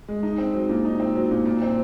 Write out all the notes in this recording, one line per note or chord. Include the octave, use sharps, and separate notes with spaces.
G#3
D#4
C4
F#3
A#2
D#4
C4
F#3
A#2
A#2
C4